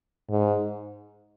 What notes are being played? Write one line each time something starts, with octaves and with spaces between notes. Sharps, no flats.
G#2